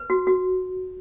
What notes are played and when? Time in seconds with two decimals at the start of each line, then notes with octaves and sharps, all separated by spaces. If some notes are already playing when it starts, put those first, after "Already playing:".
Already playing: B4
0.10 F#4
0.27 F#4